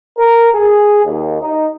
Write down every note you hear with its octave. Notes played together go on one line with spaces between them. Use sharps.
A#4
G#4
D#2
D#4